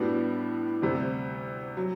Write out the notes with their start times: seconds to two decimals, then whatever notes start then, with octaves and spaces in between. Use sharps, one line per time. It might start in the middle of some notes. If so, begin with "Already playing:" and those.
Already playing: A2 G3 B3 D4 F#4
0.82 D2 C3 G3
1.77 F#3